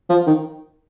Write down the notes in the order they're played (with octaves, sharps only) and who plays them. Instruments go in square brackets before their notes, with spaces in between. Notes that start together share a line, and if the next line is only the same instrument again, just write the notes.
[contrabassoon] F3
D#3